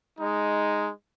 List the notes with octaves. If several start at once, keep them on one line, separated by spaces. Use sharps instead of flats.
G#3 D#4